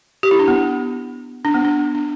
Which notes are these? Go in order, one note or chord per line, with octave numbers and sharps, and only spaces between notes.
G4
E4
D4
B3
D4
B3
D4
D4